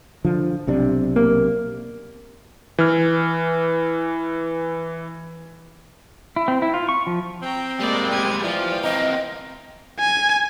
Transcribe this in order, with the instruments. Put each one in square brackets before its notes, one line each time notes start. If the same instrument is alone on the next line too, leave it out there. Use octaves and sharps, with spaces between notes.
[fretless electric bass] D3 F3
B1 C3 D4
[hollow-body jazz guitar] A#3
[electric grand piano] E3 F6
[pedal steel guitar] E4
C4
E4
F4
C#6
F3
[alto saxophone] C4 [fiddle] G5 A#5
[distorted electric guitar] G3 G#3 [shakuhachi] A#3 [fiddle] D5
[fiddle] G4 G#5
[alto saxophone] E3 [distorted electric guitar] F3 [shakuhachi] D5 [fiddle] F5 G5
[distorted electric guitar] C4 A#4 [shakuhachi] D#5
[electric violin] G#5